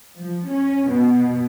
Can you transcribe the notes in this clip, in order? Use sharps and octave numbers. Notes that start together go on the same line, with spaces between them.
F3
C#4
B2